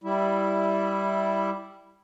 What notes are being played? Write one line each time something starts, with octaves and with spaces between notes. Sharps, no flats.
G3 E4